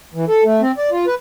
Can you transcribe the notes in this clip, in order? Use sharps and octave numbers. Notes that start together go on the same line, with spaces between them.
E3
A4
A3
C4
D5
F4
B4